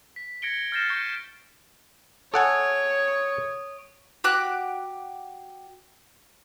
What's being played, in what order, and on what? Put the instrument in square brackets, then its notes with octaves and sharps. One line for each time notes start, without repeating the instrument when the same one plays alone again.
[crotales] B6
G#6 A#6 C#7 D7 G7
F6 G6 A6 A#6 C7 E7
C#6 G6 C#7 D7
[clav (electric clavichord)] A4 F#5 G#5 [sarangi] C#5 [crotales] C#6 D#6 D7
[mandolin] F#4 G4 D6 F#6